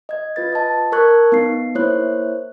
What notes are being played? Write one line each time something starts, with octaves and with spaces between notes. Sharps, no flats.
D#5 G#6
F4 B4 A6
D#5 A5
A#4 A5 C#6 F#6 G#6
B3 D#4 C7
A#3 E4 C5 C#5 F#6